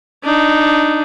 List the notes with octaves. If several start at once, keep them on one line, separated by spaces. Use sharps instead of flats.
D4 D#4